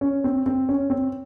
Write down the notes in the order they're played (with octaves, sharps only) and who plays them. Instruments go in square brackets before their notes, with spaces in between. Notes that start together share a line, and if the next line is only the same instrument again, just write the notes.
[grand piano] C#4
C4
C4
C#4
C4